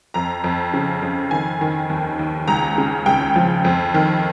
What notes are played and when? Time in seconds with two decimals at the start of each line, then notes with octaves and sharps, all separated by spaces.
0.14 F2 A#5
0.44 F2
0.74 C#3
1.02 F2
1.31 D#3 G#5
1.61 D#3
1.90 D#2
2.19 D#2
2.48 C#2 A#5
2.78 C#3
3.06 C#2 G5
3.36 F3
3.65 F2
3.94 D#3